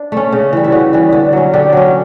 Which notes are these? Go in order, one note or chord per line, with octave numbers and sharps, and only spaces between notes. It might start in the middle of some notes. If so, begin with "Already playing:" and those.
Already playing: D4
A3 C#4
C#3
E3 G3
E4
C#3 F#4
E3 G3
D3
F#3 C#4
D3 G4
F#3 C#4